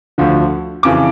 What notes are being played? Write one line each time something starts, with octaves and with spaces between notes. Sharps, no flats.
D2 D3 F3
F2 C#3 E3 D6